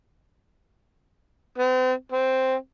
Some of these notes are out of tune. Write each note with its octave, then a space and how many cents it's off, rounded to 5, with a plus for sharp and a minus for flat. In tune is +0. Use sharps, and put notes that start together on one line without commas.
C4 -40
C4 +0